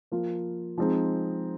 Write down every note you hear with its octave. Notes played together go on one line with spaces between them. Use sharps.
F3 A#3 F4
F3 G#3 C4 D#4